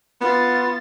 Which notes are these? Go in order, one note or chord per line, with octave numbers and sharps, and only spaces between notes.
B3 F4 A6